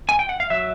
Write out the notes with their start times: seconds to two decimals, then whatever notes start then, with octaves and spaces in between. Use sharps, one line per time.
0.09 G#5
0.19 G5
0.29 F#5
0.40 F5
0.50 F#3 E5